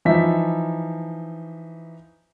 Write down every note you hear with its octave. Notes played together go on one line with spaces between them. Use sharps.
E3 F3 D#4 E5 B6